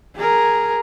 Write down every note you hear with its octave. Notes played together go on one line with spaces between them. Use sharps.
G#4 A#4